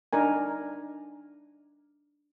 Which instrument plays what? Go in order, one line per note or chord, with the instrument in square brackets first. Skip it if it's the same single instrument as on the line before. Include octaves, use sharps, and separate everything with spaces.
[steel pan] D4 D#4 A#4 G#5